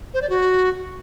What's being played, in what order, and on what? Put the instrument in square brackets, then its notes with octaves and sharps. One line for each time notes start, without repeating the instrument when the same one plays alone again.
[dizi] C5
D5
F#4